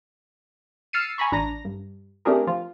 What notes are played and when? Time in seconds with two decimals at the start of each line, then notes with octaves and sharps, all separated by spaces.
0.93 E6 F6 A6 C7 C#7 D#7
1.18 G#5 A#5 B5 C#6
1.32 A1 D4 A#5 A#6
1.65 G2
2.25 A3 C4 D4 G4 G#4 A#4
2.47 F3 F4